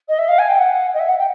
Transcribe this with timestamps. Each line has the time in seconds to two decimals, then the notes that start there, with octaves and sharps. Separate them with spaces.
0.08 D#5
0.18 E5
0.28 F5
0.38 G#5
0.48 G5
0.58 F#5
0.93 D#5
0.99 E5
1.08 F#5
1.18 G5